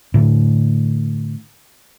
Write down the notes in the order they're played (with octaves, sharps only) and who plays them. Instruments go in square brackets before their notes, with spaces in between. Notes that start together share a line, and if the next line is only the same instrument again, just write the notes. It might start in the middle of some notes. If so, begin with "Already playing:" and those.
[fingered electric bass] A2 D3